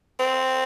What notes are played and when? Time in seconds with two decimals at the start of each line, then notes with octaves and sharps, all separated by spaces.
0.20 C4